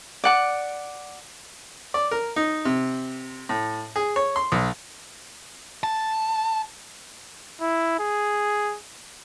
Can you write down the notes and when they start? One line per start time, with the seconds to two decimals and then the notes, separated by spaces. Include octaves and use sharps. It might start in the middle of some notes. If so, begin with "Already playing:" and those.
0.24 D5 F#5 D6
1.94 D5
2.11 A#4
2.36 D#4
2.65 C3
3.49 A2
3.96 G#4
4.16 C#5
4.36 C6
4.52 B1
5.83 A5
7.61 E4
8.00 G#4